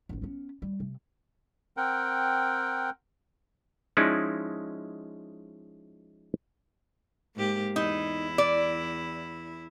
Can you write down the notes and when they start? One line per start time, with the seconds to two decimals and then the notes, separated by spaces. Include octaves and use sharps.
0.09 G#1 F#2
0.22 B3 C#4
0.62 G3
0.80 C3
1.77 C4 A#4 F#5 G5
3.97 F3 G#3 C#4 D#4 E4 D5
7.35 G#2 A#3 G4
7.76 E2 D#4 E4
8.38 D5